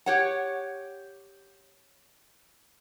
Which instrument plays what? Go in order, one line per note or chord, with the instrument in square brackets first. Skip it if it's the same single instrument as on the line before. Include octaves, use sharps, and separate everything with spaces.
[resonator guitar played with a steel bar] G4 C#5 F#5